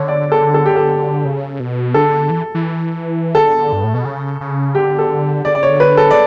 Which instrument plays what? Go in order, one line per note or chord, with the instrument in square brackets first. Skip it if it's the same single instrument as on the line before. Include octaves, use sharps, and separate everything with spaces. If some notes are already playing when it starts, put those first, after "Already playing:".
Already playing: [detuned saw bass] D3 [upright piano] C#5
[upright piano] D5
A4
A4
G4
A4
[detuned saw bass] C#3
B2
[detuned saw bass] D3 [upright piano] A4
[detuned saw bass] E3
E3
[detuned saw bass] D3 [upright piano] A4
[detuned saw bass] G2
A2
B2
C#3
C#3
[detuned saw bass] D3 [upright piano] G4
[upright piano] A4
[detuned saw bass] D3 [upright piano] D5
[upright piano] D5
[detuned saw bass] C#3
[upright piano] C#5
[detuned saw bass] D3
[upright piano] B4
A4
D5